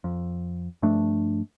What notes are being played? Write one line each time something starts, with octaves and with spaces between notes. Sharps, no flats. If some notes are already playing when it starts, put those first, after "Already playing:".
F2
G2 F3 A3 D4